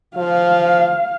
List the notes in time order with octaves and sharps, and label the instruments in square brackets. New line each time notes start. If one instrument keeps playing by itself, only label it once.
[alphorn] F3 [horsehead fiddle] F5